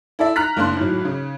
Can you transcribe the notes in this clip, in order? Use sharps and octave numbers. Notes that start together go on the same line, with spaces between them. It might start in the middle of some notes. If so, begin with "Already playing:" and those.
E4 A4 D5 E5
A#5 F6 F#6 B6
F#1 A#3 D4 C6 F#6
G#1 A2 F#3
C#3